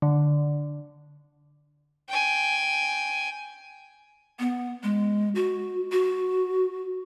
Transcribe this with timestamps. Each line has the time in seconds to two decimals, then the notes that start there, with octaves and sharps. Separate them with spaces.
0.02 D3
2.09 G5 G#5
4.39 B3
4.83 G#3
5.35 F#4
5.92 F#4